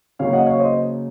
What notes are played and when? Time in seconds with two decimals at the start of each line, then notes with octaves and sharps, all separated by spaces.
0.19 C#3 F#3 A#3 C#5 F5
0.33 D#5 F#5
0.46 C#5 F5
0.60 C5 D#5